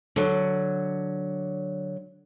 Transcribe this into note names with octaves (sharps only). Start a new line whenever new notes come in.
D3 F#3